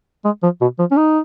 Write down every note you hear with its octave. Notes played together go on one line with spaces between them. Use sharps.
G#3
F3
B2
F3
C#4
D#4